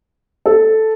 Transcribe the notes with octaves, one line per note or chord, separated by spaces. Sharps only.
A4